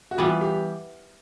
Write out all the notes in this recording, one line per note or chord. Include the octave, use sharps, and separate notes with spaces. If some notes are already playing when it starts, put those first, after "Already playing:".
F#4
E3 G3 B3 F4
G4